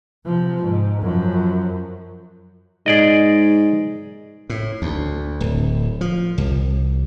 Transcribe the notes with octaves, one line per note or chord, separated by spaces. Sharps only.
C3 F3
G#2
F#2 F3
G#2 G#4 D5 D#5
A2
D2
D1
F3
C2